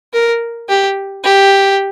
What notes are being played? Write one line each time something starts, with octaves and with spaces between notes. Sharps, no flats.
A#4
G4
G4